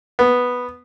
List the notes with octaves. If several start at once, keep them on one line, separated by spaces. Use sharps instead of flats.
B3